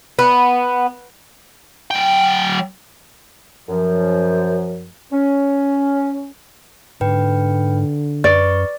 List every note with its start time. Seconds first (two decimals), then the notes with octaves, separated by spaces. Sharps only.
0.19 B3
1.91 F#3 G5
3.69 F#2 F3
5.12 C#4
7.01 G#2 D3 B4 G5
8.24 F#2 B4 D5 C#6